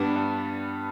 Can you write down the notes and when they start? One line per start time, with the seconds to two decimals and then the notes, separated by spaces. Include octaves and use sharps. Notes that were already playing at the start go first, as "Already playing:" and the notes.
Already playing: G2 G3 B3 D4
0.16 G2